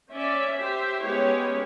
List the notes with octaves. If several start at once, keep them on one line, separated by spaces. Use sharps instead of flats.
C#4 D5 E5
G4 C5 E5
G#3 B3 C#4 E4 G4 C#5